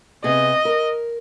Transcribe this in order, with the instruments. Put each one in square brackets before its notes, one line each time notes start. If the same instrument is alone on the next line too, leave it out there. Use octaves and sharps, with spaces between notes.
[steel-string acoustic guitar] C3 B3 G#4 [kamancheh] D#5
[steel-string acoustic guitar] A#4